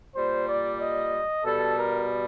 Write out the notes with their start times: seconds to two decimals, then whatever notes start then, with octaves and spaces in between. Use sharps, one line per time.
0.15 A#2 G3 C5
0.47 D5
0.80 D#5
1.45 B2 G3 A4
1.78 A#4